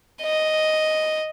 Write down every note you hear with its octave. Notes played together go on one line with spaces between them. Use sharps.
D#5